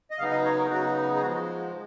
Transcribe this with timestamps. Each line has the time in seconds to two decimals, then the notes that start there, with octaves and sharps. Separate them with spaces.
0.11 D#5
0.19 C#3 F#3 B3 D#4 F5
0.31 D#5
0.45 C#5
0.58 A#4
0.70 C#3 F#3 B3 D#4 F#4
1.15 G#4
1.21 F3 G#3 F#4